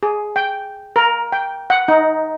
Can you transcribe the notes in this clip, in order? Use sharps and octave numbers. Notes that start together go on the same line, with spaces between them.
G#4
G5
A#4
G5
F#5
D#4